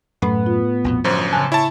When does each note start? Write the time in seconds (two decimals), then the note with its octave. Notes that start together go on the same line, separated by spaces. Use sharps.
0.22 F#2 A2 A3 B3 B5
0.46 F4
0.84 A#1 F2 B2
1.04 G1 F#2 F3 C5
1.32 C#3 G#5 A5 F#6
1.52 E4 C#5 A5